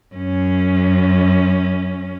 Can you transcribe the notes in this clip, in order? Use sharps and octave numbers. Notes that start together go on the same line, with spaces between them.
F#2 C#4